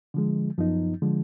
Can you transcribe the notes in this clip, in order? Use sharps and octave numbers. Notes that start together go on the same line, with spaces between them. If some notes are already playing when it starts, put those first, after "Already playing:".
D3 F3 G#3
F#2 F3 B3 D#4
D3 F3 G#3